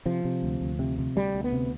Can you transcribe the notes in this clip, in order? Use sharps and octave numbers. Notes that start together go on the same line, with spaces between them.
C3 F3
C3
D2
D2
C3
C3
D2 G3
D2
B3
C3